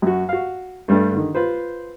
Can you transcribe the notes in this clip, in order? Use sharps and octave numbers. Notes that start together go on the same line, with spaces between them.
F#2 F#4
F#4 F5
G2 G3 A3 D4
D3 D#3
F4 B4 C5